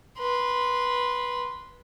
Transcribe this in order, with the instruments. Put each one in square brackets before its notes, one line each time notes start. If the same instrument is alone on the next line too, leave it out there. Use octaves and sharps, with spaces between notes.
[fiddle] B4 C6